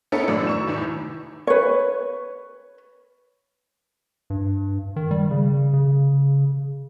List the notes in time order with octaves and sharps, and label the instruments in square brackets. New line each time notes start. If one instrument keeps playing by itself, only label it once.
[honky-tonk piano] B3 C#4 D#4 E4 A4 A#4
F#2 A2 D#3 D4 D5 E6
A#5 C#6 E7
E2 A2 D#3 E3
[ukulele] B4 C#5
[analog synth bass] G2
D#3
G3
C#3
C#3